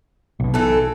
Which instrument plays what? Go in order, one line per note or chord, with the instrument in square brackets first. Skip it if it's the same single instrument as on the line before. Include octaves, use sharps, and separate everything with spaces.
[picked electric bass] B1 B2
[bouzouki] E3 A4